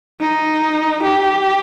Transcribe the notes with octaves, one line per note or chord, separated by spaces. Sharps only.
D#4
G4